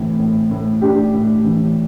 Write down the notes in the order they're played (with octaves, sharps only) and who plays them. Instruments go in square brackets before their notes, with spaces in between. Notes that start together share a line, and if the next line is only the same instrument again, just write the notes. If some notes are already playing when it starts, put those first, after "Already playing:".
Already playing: [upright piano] A2 E3 C4
A2
A2
A2 D4 G4
A2
E3